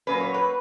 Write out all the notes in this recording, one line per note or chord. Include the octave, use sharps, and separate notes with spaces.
A#2 F#3 A#3 C#4 B4
C#5
B4